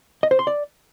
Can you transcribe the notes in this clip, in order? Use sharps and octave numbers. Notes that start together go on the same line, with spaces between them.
D#5
C5
C6
D5